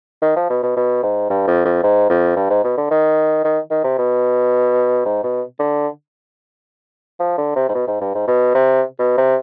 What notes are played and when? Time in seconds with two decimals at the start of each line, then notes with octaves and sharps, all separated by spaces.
0.22 D#3
0.36 F3
0.50 B2
0.63 B2
0.76 B2
1.03 G#2
1.30 G2
1.47 F2
1.65 F2
1.83 G#2
2.10 F2
2.36 G2
2.50 G#2
2.64 B2
2.77 D3
2.91 D#3
3.45 D#3
3.71 D#3
3.84 C3
3.98 B2
5.05 G#2
5.24 B2
5.60 D3
7.20 F3
7.38 D3
7.56 C3
7.69 G#2
7.74 B2
7.87 G#2
8.01 G2
8.15 G#2
8.28 B2
8.54 C3
8.99 B2
9.17 C3